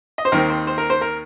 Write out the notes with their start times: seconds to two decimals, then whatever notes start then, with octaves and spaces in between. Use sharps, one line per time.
0.18 D#5
0.25 C5
0.32 D#2 D#3 C4 A#4
0.50 C5
0.67 C5
0.78 A#4
0.90 C5
1.01 A#4